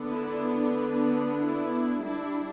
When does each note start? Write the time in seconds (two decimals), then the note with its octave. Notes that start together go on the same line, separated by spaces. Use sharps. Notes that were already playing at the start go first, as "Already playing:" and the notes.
Already playing: D3 B3 D4
0.12 E4
1.39 E4
2.01 G3 D4 E4